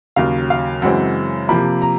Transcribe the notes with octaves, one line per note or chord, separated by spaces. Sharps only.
D#2 C#3 F#3 F5
F5
F#2 C#3 E3 G#3 C4 F#5
C3 F3 A#3 B5
A#5